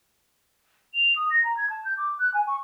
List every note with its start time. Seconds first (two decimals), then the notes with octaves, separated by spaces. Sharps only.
0.94 F7
1.16 D#6
1.30 A#6
1.43 A#5
1.57 G#6
1.70 A5
1.84 G6
1.98 D6
2.19 F#6
2.34 G#5
2.47 C#6